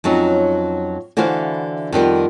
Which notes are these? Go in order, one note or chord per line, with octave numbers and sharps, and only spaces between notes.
F2 F#3 C#4 D#4
D3 E3 E4 F#4 C5 F5
F2 D#3 G3 B3